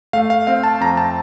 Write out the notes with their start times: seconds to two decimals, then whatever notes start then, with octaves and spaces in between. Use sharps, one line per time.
0.13 A3 F5
0.30 F5
0.47 C4 F5
0.64 A5
0.81 F2 A#5
0.97 A5